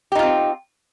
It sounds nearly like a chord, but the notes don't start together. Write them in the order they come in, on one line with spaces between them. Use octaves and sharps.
G4 D#4 F4 C4